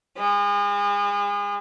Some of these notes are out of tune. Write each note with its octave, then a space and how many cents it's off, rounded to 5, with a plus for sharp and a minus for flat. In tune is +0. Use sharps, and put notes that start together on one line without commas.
G#3 -35